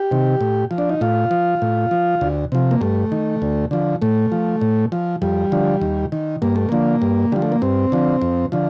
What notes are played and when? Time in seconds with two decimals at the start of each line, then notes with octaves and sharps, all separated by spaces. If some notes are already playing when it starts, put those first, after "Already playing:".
Already playing: G4
0.11 C3 D#3
0.41 A2
0.71 F3
0.78 D4
0.89 D#4
1.01 A2 F4
1.31 F3
1.62 A2
1.91 F3
2.21 D2
2.52 C3 F3
2.71 A#3
2.81 G2 A3
3.12 D#3
3.42 D2
3.71 D3 F3
4.02 A2 A3
4.32 F3
4.61 A2
4.92 F3
5.22 F2 G3
5.52 D3 F3
5.82 D#2
6.12 D#3
6.42 G2 A#3
6.56 A3
6.69 D3 F3 A#3
7.02 G2
7.32 D3 F3 G3
7.42 A3
7.52 A#3
7.62 G2 C4
7.92 D3 F3
8.22 F2
8.52 D3 F3